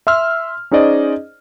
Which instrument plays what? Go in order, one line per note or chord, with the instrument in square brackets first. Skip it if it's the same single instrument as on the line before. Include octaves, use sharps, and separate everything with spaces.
[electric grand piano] E5 C6 E6 F6
C#4 D#4 G#4 C5 D5 D#5